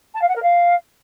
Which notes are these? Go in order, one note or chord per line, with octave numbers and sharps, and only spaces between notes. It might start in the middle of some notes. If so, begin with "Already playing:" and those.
A5
F5
F#5
A#4
F5